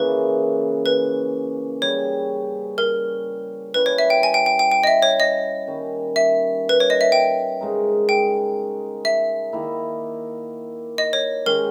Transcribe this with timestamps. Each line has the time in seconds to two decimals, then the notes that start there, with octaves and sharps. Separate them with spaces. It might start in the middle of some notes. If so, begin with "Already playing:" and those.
Already playing: C#3 E3 A#3 C#4 B4
0.86 B4
1.82 C#3 G3 C#4 G4 C#5
2.78 A#4
3.74 G3 C#4 E4 B4
3.86 C#5
3.98 E5
4.10 G5
4.23 G#5
4.34 G5
4.46 G5
4.59 G5
4.71 G5
4.84 D#5
4.87 E5
5.02 C#5
5.20 D#5
5.67 D#3 G3 A#3 C#4
6.16 E5
6.69 B4
6.80 C#5
6.90 D#5
7.01 E5
7.12 G5
7.61 C#3 G#3 D#4 A#4
8.09 G5
9.05 E5
9.52 D#3 A#3 E4
10.98 D#5
11.13 C#5
11.46 D#3 G#3 C#4 G4 A#4